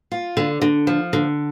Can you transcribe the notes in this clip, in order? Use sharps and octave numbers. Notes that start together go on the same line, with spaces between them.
F4
D3
D3
F3
D3